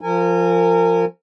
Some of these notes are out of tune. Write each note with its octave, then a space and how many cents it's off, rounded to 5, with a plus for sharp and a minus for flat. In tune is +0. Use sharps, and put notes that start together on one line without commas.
F3 +0 A#4 -30 G#5 -15